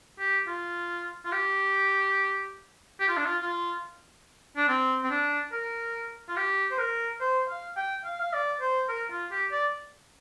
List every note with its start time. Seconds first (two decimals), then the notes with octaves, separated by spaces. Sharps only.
0.19 G4
0.48 F4
1.25 F4
1.32 G4
3.00 G4
3.08 F4
3.17 D4
3.26 F4
3.42 F4
4.56 D4
4.68 C4
5.04 C4
5.10 D4
5.52 A#4
6.29 F4
6.37 G4
6.71 C5
6.78 A#4
7.21 C5
7.49 F5
7.77 G5
8.05 F5
8.21 F5
8.33 D5
8.61 C5
8.89 A#4
9.10 F4
9.31 G4
9.52 D5